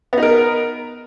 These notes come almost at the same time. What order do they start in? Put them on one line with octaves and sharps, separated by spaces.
B3 D#4 A#4